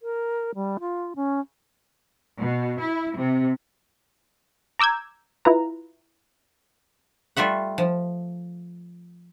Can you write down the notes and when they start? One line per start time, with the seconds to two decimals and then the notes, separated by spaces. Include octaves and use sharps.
0.01 A#4
0.55 G3
0.80 F4
1.16 C#4
2.40 B2
2.80 E4
3.16 C3
4.79 A#5 D6 E6 G6 G#6
5.45 E4 F4 B4 A#5
7.37 G3 A3 F4 E5 F#5
7.78 F3